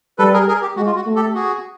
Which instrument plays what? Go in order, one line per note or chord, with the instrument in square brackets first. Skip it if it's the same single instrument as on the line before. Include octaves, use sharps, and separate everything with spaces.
[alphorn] G3 [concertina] A4 B4
[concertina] G#4 A#4
G#4 A#4
G4
[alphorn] G#3 [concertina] F#4
[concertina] F4
F#4
[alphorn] A3
[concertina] G4 A4
F#4 G#4